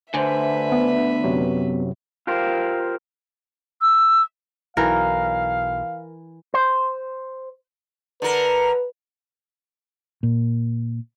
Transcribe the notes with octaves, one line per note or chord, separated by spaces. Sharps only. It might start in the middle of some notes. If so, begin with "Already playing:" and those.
D2 D3 B4 C5 E5 G#5
B3
F#2 C3 F#3
F4 G4 A#4 C5
E6
B1 E3 A#4 F5
C5
D3 A#4 B4
A#2